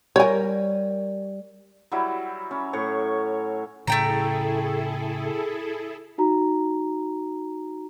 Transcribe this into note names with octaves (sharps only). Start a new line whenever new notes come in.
G3 A#4 C#5 G#5
F#3 G3 E4
C#4
A2 C#5 C#6
A2 C#3 A3 E4 G#4 A4 G5 A#5
D#4 F#4 A#5